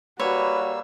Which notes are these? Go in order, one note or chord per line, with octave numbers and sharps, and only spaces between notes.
G3 A#3 F#4 B4 C#5 E6